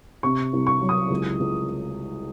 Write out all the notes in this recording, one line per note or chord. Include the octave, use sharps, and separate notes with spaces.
C3 C#6
C2
C#6
F#3
D#6
C#2
C#2